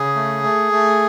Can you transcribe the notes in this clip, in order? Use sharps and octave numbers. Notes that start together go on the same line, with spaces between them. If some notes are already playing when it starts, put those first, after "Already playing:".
Already playing: C#3 G#4
A3
A3
A3